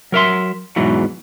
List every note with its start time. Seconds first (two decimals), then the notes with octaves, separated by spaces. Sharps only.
0.12 F#3 A#4 E5 C6
0.76 E2 G#2 B2 E3 F#3